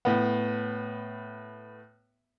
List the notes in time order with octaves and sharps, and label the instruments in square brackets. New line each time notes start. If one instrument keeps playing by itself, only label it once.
[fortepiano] A2 B3